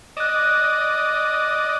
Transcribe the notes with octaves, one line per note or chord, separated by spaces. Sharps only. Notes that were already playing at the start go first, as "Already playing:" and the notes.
D5 D#5 F#6 E7